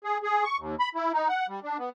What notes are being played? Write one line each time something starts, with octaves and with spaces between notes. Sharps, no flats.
G#4
G#4
C#6
D#2
B5
E4
D#4
F#5
G3
D4
B3